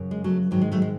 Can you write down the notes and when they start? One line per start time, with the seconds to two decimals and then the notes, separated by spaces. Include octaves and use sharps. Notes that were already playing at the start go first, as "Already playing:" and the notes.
Already playing: F#2 C#3
0.11 G#3
0.24 F#3 A3
0.51 G#2 D#3 F#3
0.61 G#3
0.72 F#3 A3
0.82 G#3